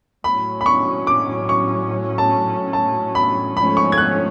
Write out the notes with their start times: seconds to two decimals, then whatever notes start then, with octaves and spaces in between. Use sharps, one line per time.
0.24 A2 F#3 C#4 B5
0.61 B5
0.66 C#6
1.07 D6
1.49 C#6
2.18 A5
2.73 A5
3.15 B5
3.56 G#2 F3 A3 C#4 B5
3.77 C#6
3.92 G#6
3.98 F#6